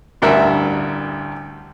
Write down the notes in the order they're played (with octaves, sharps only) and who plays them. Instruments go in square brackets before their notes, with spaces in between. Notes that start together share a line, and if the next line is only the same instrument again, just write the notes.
[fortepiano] A1 D2 G2 A#4 E5